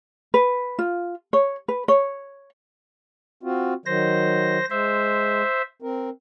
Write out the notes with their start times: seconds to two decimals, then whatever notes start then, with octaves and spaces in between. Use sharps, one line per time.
0.34 B4
0.79 F4
1.33 C#5
1.68 B4
1.88 C#5
3.43 C4 F4 F#4
3.86 D#3 F#3 C5 A#6
4.70 G#3 C5 E5
5.82 C4 A#4